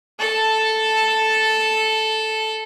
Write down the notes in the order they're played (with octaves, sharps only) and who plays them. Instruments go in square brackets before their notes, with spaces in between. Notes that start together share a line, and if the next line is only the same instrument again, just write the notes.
[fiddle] A4 [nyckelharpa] A5